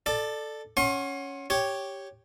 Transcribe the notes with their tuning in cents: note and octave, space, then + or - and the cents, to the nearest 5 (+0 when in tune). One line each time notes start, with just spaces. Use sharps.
A4 +0 D5 +20
C#4 +0 F#5 +0 C6 +40
G4 +0 C#5 +0